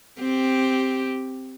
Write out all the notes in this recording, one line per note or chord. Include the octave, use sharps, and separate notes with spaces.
C4 G4